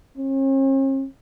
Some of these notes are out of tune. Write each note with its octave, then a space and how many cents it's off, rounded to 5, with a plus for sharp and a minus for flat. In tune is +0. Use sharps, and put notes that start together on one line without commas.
C#4 -45